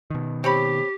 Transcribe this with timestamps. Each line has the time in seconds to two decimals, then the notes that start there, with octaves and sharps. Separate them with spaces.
0.10 B2 D#3
0.44 C4 G4 C#5 B5